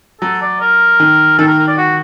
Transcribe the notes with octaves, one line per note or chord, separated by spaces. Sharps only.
F#3 A4
D5
A#4
D#3
D#3 A4
A#4
A#4
D5
F#4